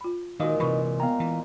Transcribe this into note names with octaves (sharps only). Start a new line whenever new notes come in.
F4 B5
A#2 D#3 G#3 D#4 F#4 C5 D#5 F5
C3 E3 B4 B5 C#6
B3 F5 G5 A#5
E3